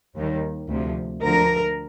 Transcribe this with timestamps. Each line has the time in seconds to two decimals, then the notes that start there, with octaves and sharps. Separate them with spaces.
0.17 D#2 D#3 G3
0.70 D2 C3 F3
1.23 D2 D3 F3 A#4